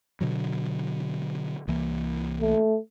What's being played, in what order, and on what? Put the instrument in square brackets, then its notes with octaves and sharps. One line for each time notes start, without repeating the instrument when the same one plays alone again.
[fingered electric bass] B2 D3 F#3
C2 E3 A#3
[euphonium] A3